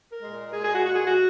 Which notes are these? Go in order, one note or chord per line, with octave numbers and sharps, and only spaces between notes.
A#4
A#2 G#3
A#2 G#3 G#4
G#4
F#4
A#2 G#3 F#4
G#4
F#4